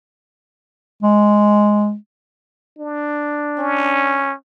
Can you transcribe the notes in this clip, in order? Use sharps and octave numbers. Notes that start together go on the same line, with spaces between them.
G#3
D4
C#4